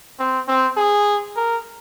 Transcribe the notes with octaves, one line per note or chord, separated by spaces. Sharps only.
C4
C4
G#4
A#4